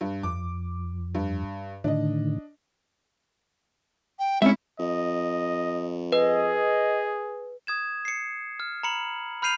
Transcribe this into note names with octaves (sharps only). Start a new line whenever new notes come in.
G2
F2 D6
G2
A2 D3 D#3 D4 D#5
G5
G#3 C4 C#4 E4 E5
F2 D#5
G#4 B4 D#5
D#6 G#6 E7
C7 C#7
F6
A#5 B5 C#7 F#7
B5 F6 G6 C7 D#7 F7